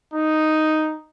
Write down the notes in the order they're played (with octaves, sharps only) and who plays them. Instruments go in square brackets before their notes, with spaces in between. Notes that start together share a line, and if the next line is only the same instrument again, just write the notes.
[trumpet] D#4